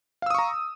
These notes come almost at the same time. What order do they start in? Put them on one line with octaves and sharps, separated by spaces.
F5 E6 D#6 C#6 A#5